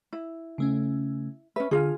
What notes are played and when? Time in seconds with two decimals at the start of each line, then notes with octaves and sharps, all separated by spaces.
0.13 E4
0.58 C#3 A3 C#4
1.56 C#4 B4 E5
1.71 D3 F4 G#4 F6